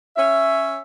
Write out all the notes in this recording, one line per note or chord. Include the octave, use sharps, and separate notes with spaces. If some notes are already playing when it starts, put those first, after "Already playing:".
C#4 E5